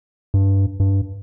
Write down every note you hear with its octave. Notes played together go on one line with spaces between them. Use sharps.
G2
G2